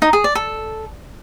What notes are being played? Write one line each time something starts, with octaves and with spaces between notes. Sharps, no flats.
D#4
G#4
D5
A4